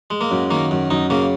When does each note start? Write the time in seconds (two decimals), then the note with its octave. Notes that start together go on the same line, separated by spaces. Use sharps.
0.10 G#3
0.21 A#3
0.31 F#2
0.51 D#3 A#3
0.71 F#2
0.90 F#2 D#4
1.10 C#3 A#3